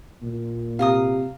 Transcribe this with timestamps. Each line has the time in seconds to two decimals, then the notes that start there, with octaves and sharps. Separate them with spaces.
0.23 A#2
0.79 C3 F5 A#5 D#6